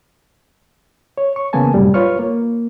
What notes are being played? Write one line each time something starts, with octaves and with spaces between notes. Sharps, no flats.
C#5
C#6
C#3 E3 A#3 B3 G#5 A5
F#2 A2 C3 G3
F4 B4 C#5 C#6 F6
A#3